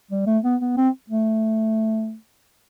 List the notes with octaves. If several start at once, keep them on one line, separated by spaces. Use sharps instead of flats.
G3
A3
B3
B3
C4
A3